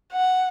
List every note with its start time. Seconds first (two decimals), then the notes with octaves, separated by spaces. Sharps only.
0.12 F#5